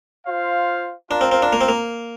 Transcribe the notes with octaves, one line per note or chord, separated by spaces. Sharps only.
F4 C5 F5
D4 F4 A#4 F5
C4
C4
D4
A#3
C4
A#3